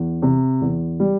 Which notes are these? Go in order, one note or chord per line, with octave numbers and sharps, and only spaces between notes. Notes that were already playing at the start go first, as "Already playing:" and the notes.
Already playing: E2
C3
E2
G3